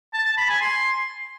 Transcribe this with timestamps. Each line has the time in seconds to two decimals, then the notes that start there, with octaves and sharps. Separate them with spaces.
0.14 A5
0.26 A5
0.38 B5
0.49 G#5
0.61 C6